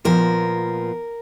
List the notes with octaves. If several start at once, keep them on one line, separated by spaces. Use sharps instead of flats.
A#2 F3 B3 A#4